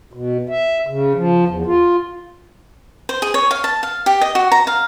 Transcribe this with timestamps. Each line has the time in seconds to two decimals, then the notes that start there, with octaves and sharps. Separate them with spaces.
0.13 B2
0.49 E5
0.87 C#3
1.15 F3
1.48 E2
1.66 F4
3.09 C5
3.22 G#4
3.34 C#5
3.51 F5
3.64 A5
3.83 F5
4.06 G4
4.21 D#5
4.35 F#4
4.52 A#5
4.67 F5